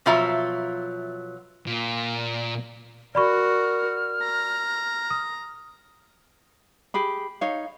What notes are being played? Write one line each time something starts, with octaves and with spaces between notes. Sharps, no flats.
B2 F3 F#3 F4 E5 A#5
A#2
F#4 A#4 D5 B5 C#6 F6
A#5
D#6
G4 G#4 B5
D#4 C#5 F5